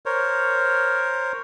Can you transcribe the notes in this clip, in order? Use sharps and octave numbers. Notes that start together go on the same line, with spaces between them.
A#4 C5 C#5